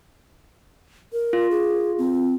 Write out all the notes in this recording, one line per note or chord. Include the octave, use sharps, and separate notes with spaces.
A#4
F4
G#4
C4